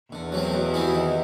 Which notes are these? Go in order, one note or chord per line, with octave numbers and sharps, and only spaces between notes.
E2 D3
F#3 A3 C4
B2
G3 C4 E4 G#4
D#3